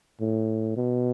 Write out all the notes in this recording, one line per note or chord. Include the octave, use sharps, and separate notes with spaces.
A2
B2